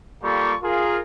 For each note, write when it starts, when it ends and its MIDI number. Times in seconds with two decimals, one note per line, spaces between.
0.23 0.55 55
0.23 0.55 58
0.23 0.55 65
0.23 0.55 67
0.23 0.55 69
0.23 0.55 85
0.63 0.99 65
0.63 0.99 68
0.63 0.99 70